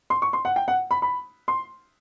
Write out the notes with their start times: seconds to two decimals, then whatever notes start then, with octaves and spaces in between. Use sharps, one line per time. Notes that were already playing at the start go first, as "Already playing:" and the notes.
0.10 C6
0.22 C#6
0.33 C6
0.45 F#5
0.56 G5
0.68 F#5
0.91 B5
1.02 B5
1.48 C6